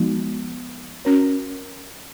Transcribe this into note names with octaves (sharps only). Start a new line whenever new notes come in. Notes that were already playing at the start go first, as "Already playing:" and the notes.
Already playing: F3 G#3 B3 D#4 F#4
C#4 F#4 A#4 C#5